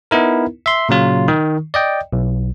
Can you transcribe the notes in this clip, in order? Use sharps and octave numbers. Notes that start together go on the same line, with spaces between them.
B3 D#4 E4 A#4
E5 C6
A#2 C#3 F#3 F4
D#3
D5 D#5 G5
B1